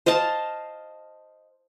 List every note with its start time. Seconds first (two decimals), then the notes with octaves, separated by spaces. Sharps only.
0.06 C5 D#5 F5 A5